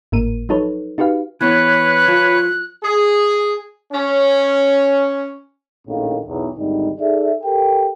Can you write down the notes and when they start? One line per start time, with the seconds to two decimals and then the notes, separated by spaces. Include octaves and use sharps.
0.12 G#1 A2 A#3 A#4 D#7
0.49 F3 F#3 D#4 A4 B4 C#5
0.98 D#4 F#4 G4 B4 F5
1.41 E3 B3 B4 C#5 F#6
2.08 F3 F4
2.83 G#4
3.92 C#4
5.87 A#1 A2 D#3 C#4 A4 F5
6.26 B1 E2
6.56 G#1 D2 G3 D#4
6.99 D#4 G#4 A4 D5 E5
7.43 G4 A4 A#4 G5